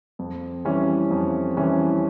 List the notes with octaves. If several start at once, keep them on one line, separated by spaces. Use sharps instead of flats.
F2
E3 G3 C#4
F2
E3 G3 C#4